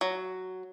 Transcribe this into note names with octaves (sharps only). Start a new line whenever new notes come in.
F#3